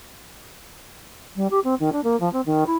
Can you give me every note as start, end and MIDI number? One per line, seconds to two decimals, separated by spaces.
1.35 1.47 55
1.50 1.59 67
1.64 1.74 60
1.80 1.92 51
1.92 2.00 62
2.04 2.18 58
2.20 2.30 53
2.32 2.41 60
2.46 2.64 51
2.66 2.77 64